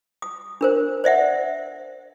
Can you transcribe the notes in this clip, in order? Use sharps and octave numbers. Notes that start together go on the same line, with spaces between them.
D#6
D4 A#4 C5
C5 D5 E5 F#5